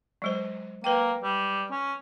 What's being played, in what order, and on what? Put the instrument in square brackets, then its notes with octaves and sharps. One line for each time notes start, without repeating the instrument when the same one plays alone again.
[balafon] F#3 G#3 C5
[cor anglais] A#3 [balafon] B4 G5
[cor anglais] G3
C#4